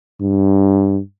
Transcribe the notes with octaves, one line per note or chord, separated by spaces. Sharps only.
G2